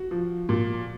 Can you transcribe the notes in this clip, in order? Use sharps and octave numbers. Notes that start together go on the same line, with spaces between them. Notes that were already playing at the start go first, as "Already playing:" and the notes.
Already playing: F#4
F3
A#2